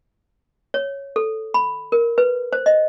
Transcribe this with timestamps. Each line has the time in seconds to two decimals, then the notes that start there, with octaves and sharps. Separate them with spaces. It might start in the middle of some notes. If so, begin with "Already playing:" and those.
0.74 C#5
1.16 A4
1.54 B5
1.92 A#4
2.18 B4
2.53 C5
2.66 D#5